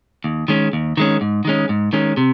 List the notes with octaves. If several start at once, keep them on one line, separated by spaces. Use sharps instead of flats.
D#2
D#3 G#3 C#4
D#2
D#3 G#3 C#4
G#2
D#3 G#3 C#4
G#2
D#3 G#3 C#4
C3